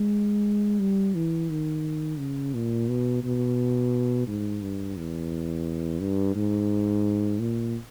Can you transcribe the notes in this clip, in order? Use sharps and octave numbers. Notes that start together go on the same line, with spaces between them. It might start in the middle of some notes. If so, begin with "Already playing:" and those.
Already playing: G#3
G3
E3
D#3
C#3
A#2
B2
B2
G#2
G2
E2
G2
G#2
A#2